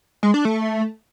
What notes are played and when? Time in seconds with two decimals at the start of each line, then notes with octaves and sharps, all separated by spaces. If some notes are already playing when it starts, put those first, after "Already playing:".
0.23 G#3
0.34 D4
0.45 A3